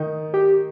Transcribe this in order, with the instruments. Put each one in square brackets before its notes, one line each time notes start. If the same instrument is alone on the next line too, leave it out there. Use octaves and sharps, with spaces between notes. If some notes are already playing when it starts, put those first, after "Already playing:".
Already playing: [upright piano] D#3 D#4
[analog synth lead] G4